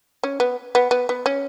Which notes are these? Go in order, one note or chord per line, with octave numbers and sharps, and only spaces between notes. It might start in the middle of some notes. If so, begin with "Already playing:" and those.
C#4
B3
B3
B3
B3
C#4